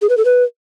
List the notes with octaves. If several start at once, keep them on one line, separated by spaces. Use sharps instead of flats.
G#4
B4
A4
B4